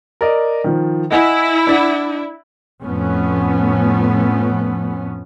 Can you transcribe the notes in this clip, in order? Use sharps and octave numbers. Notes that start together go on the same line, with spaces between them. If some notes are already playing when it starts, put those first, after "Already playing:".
A#4 D5 D#5
D#3 F3
E4 D#5 F#5 G#5
D4 D5 F#5
F2 A2 F3 A3 B3 C#4